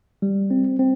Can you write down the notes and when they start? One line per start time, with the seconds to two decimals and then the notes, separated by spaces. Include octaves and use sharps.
0.22 G3
0.51 C4
0.79 C4